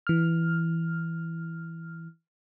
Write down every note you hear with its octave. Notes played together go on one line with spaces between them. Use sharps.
E3 F6